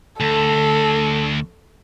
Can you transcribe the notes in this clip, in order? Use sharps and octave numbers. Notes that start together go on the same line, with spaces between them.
D2 A4